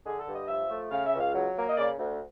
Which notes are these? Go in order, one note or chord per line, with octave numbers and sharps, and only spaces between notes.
D3 G#4
A4
G2
D#5
F3 E5
A3
C#3 F5
E5
C#2
F5
F#3
A#3
D#5
C#3 D5
D2